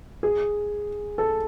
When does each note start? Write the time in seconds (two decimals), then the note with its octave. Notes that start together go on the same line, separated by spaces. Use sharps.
0.23 G#4
1.18 A4